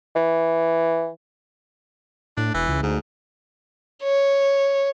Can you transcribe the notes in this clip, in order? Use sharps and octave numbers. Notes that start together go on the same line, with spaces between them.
E3
A2 D4
E1 E3
C#2
D2 G#2
C#5